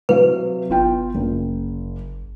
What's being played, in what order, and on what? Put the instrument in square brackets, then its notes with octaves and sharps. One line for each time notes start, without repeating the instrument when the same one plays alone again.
[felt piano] C3 F#3 F5 [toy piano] B4
[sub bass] G1 [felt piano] B3 F4 G5
[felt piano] F#1